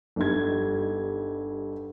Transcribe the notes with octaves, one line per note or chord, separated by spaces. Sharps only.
G1 G2 D#4 G4 G#6